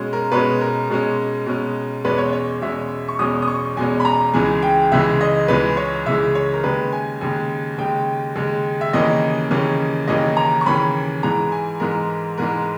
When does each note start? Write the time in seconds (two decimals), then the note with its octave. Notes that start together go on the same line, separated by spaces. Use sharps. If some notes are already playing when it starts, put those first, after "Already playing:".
Already playing: B2 G#3 C#4
0.13 A#4
0.32 B2 G#3 C#4 B4
0.61 A#4
0.90 B2 G#3 C#4
1.46 B2 G#3 C#4
2.04 E2 B2 G#3 C#4 B4
2.18 C#5
2.33 C#5
2.62 E2 B2 G#3 C#4 E5
3.08 C#6
3.19 E2 B2 G#3 C#4 D#6
3.42 D#6
3.48 C#6
3.76 E2 B2 G#3 C#4 G#5
4.00 B5
4.05 A#5
4.33 C#2 C#3 E3 G#3 G#5
4.62 G5
4.92 C#2 C#3 E3 G#3 E5
5.21 D#5
5.48 C#2 C#3 E3 G#3 B4
5.77 C#5
6.06 C#2 C#3 E3 G#3 E5
6.35 C#5
6.54 A#4
6.64 D#2 C#3 G#3 B4
6.93 G#5
7.21 D#2 C#3 G#3
7.78 D#2 C#3 G#3 G5
8.36 D#2 C#3 G#3
8.81 E5
8.93 D#2 C#3 E3 A#3 C#4 D#5
9.51 D#2 C#3 E3 A#3 C#4
10.08 D#2 C#3 E3 A#3 C#4 D#5
10.37 A#5
10.61 C#6
10.66 D#2 C#3 E3 A#3 C#4 B5
11.23 G#2 E3 G#3 A#5
11.52 G#5
11.80 G#2 E3 G#3 A#4
12.38 G#2 E3 G#3 A#4